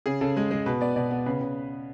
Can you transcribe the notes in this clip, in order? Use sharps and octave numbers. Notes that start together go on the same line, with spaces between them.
C#3 G#4
C#3 A4
G#3
G#3
B2 B4
B3 D5
B2 D5
B3
C#3 B4
C#3